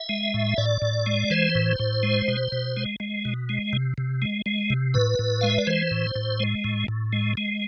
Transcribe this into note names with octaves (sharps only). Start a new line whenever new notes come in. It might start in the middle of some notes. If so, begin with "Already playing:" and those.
Already playing: E5
G#3
A2
A2 D5
A2
G#3
E3 C5
A2
A2
G#3
B2
B2
G#3
G#3
B2
G#3
C3
C3
G#3
G#3
C3
A2 B4
A2
G#3 F5
E5
D5
E3 C5
A2
A2
G#3
A2
A2
G#3
G#3